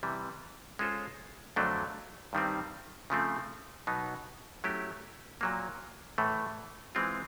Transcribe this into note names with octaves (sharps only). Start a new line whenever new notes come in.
C3 E3 G3
G#3 C#4 F4 A4 C5
F2 D3 F#3 A3 D4
G2 D#3 G3 C4
C#3 F3 A3 C4
B2 F#3 B3 D#4
F#3 A3 C#4 E4 G4
A#2 F#3 A#3
A2 E3 A3
E3 G#3 C4 F4